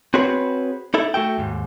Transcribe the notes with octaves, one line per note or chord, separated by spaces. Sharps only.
C4 F#4 G#4 B4 C#5 B5
D#4 E4 A4
A3 F#4 A4 G5
D#2 G#2